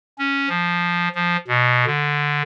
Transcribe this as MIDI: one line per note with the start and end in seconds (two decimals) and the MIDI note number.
0.18 0.49 61
0.49 1.09 53
1.15 1.37 53
1.48 1.85 47
1.86 2.42 50